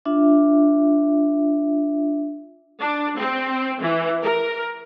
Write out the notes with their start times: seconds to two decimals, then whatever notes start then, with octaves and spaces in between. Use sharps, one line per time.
0.05 D4 F4 E5
2.80 D4
3.16 C4
3.81 E3
4.22 A#4